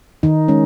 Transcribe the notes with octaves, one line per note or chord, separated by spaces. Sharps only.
D#3 D#4
G#3 C#4